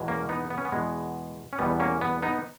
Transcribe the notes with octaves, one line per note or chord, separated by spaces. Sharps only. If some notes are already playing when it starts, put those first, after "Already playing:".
Already playing: E2 B2 G#3
A#3 C#4
B3 D#4
B3
C#4
B3
E2 B2 G#3
C#4
E2 B2 G3 B3
A#3 C#4
B3
B3 D#4